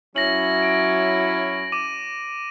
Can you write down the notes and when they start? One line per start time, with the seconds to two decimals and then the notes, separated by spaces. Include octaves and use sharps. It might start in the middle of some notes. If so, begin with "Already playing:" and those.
0.16 F#3 C#4 E4 A#6 F#7
0.62 D7
1.72 D6 D#7